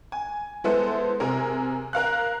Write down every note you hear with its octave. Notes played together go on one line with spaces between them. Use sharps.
G#5
G#3 B3 E4 A4 C5
C3 G#4 A#4
A#4 F5 F#6